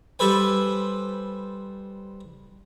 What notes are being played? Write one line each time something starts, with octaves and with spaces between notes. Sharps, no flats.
G3 A4 B4 C5 G#5